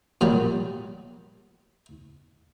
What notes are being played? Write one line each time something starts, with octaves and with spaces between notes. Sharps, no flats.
A#2 F#3 G3